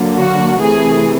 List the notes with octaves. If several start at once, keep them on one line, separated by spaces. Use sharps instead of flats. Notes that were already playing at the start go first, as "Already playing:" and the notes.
Already playing: D3 F#3 A#3
F#4
C3 E3 A3 G#4